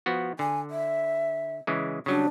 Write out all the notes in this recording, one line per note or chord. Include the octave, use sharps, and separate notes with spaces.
F3 B3 F#4
D3 G#5
E5
C#3 E3 G#3
C#3 F#3 G3 D4